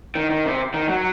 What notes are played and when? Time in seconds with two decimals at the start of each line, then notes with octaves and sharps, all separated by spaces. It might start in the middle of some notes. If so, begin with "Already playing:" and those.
0.15 D#3
0.30 D#3
0.45 C3
0.74 D#3
0.89 F#3